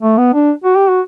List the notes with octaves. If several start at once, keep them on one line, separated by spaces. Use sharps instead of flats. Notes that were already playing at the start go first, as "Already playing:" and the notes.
A3
B3
D4
F#4
G4
F#4